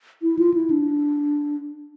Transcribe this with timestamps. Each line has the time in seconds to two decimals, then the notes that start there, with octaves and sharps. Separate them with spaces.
0.22 E4
0.39 F4
0.54 E4
0.70 D4